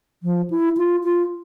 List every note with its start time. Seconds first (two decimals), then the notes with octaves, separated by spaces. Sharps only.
0.23 F3
0.50 E4
0.77 F4
1.04 F4